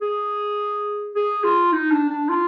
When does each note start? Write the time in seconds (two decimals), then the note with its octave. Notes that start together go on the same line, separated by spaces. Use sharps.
0.02 G#4
1.15 G#4
1.44 F4
1.72 D#4
1.91 D4
2.10 D4
2.29 F4